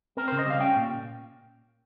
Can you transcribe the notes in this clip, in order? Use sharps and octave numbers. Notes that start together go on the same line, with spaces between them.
C4 A#4
C#3 C5
D#5
G3 F5
C#4 G5
A#2